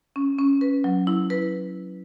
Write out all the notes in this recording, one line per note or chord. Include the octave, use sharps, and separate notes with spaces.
C#4
C#4
B4
F#3
E4
B4